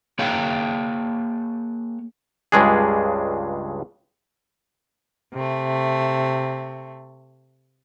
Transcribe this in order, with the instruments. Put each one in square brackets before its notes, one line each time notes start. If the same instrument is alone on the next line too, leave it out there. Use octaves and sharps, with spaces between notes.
[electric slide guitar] A#3 G#4 C#5 F5 G5
[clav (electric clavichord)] C#2 G2 C#3 G#3 D4 G#4
[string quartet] C3 A3